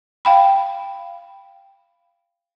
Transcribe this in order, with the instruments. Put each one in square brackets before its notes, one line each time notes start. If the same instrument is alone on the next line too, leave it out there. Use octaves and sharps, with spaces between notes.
[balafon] F5 G5 B5